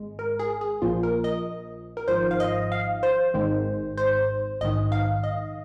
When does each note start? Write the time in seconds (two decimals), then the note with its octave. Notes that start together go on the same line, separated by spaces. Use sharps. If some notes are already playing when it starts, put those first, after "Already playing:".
Already playing: G#1 G#3
0.19 A#4
0.39 G#4
0.61 G#4
0.82 A#1 A#2 F3 A#3 F4
1.03 A#4
1.24 D#5
1.97 A#4
2.08 G#1 G#2 F3 C5
2.31 F5
2.40 D#5
2.72 F5
3.03 C5
3.34 G#1 G#2 D#3 G#3
3.98 C5
4.61 A#1 G#2 D#3 D#5
4.92 F5
5.24 D#5